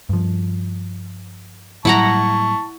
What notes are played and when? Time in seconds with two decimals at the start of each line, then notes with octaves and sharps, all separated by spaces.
0.09 G2 F3
1.85 A2 F#3 G3 E4 F#5 A5 A#5 C#6